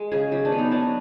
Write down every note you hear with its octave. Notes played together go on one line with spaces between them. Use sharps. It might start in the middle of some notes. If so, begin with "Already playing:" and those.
Already playing: G#3
C#3 G#4
F#3 G4
D4
B3
D#4
F#3 D4